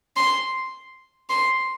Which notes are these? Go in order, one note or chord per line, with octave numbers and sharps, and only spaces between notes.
C6
C6